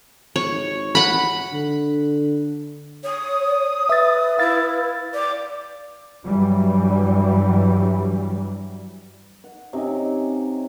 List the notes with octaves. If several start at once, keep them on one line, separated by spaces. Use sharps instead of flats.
G#1 C#5
F#5 B5
D3
C#5 D#6
B4 E5 A6
E4 F5 A6
D5 D6
G2 E3 F#3 G3
F#5
C3 C#4 D#4